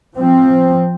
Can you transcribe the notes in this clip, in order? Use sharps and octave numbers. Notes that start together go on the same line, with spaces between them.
F3 C4